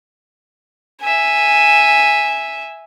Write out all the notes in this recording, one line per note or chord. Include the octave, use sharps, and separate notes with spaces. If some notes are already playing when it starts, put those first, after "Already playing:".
E5 G#5